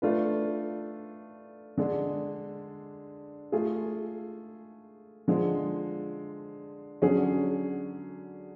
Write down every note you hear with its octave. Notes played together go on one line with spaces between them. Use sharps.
A3 D4 F4 B4
D3 G#3 D4
A3 F4 G#4
D3 F3 G#3
D3 F#3 C#4 G#4